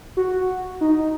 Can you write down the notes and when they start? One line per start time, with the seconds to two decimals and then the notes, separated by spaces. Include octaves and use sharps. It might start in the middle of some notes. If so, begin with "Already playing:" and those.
0.17 F#4
0.81 D#4